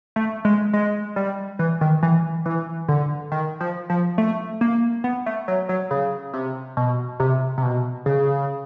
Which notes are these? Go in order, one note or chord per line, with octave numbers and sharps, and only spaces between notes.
A3
G#3
G#3
G3
E3
D#3
E3
E3
D3
D#3
F3
F3
A3
A#3
B3
A3
F#3
F#3
C#3
C3
B2
C3
C3
B2
C#3